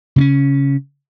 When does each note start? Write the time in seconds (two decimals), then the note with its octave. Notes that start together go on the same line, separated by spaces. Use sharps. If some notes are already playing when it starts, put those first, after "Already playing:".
0.16 C#3 C4 C#4